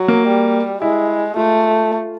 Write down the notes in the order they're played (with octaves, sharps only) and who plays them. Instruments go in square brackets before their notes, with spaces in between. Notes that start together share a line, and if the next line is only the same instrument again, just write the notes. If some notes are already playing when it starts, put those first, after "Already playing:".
Already playing: [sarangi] F#3
[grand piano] A#3
[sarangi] G3
[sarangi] G#3 [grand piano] E4
[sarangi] A3 [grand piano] F4